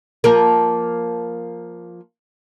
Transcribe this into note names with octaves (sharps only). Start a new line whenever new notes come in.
F3 A#3 A#4